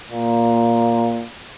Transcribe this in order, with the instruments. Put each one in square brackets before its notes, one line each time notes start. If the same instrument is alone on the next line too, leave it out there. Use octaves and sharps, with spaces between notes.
[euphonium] A#2